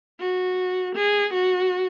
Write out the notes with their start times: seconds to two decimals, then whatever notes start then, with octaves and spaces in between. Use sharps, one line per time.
0.20 F#4
0.95 G#4
1.33 F#4